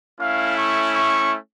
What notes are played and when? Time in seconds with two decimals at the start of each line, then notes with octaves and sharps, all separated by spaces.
0.21 A3 C#4 E4 F5
0.58 C#6
0.94 C#6